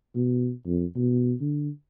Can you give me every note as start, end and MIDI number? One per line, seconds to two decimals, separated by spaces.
0.15 0.51 47
0.67 0.85 41
0.96 1.33 47
1.41 1.69 50